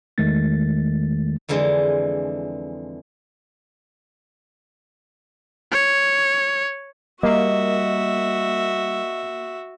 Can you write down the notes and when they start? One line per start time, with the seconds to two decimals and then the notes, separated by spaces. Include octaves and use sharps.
0.18 E2 D#3 G#3 A3 A6
1.49 F2 D3 E3 G#3
5.71 C#5
7.23 G3 A#3 F#4 D#5 E5